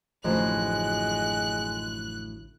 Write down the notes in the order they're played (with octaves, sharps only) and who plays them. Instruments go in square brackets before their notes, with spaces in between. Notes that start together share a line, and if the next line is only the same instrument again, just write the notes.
[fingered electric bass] A1 D3 [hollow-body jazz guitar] F#2 A2 F3 [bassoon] G#3 [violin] F#6